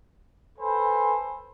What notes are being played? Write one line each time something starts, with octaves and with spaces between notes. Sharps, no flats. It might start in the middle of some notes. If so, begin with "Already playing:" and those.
A4 B4 C5 G#5 B5